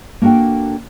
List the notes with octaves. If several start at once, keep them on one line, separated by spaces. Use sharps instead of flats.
A#3 D4 F#4 A4 G5